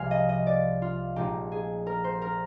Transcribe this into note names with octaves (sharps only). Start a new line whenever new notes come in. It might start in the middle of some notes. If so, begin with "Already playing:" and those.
Already playing: C2 C3 F3 G#3 F5 G#5
D#5
D#5
D5
F4
A#1 A#2 G#3 C4 D#4 G4
G#4
A#4
C5
A#4